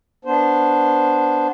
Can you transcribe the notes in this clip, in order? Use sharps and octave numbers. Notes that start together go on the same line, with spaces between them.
B3 D4 C5